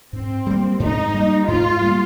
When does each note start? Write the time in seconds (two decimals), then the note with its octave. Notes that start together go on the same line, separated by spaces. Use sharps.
0.13 G#2 C4
0.47 G3 A#3
0.80 G#2 D#4
1.14 G3 A#3
1.48 G#2 F4
1.82 G3 A#3